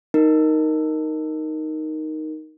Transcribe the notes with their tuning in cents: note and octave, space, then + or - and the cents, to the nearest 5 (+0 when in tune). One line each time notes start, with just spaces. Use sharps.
D#4 +0 A#4 +0